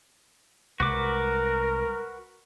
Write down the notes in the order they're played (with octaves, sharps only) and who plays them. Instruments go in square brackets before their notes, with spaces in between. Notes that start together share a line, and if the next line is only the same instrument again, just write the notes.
[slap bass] C2 G#3 [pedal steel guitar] F#4 B4 D6 [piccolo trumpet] A#4